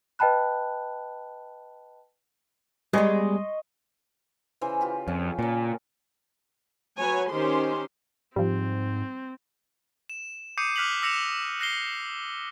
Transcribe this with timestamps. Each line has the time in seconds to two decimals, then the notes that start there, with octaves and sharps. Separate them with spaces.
0.19 B4 D#5 G5 A5 B5 F#6
2.93 G3 G#3 B3 D#5 C6 C#6
4.61 C#3 E3 C5
4.81 F4 G4 B5
5.08 F2 C#4
5.39 A#2 C#3 A#4
6.98 F#3 F#4 B4 C#5 G#5
7.31 D#3 C#4 G4 C5 C6
8.36 G#2 F3 G3 C4
10.09 E7
10.58 D6 D#6 G6 C7 C#7 D#7
10.76 D6 F6 F#6 B6 F7 F#7
11.02 D6 E6 A#6 C#7 E7 F7
11.60 F#6 A#6 C7 G7